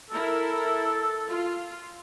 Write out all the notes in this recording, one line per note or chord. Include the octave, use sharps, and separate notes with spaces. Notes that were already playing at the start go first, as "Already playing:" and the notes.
E4 A4 A#4
F4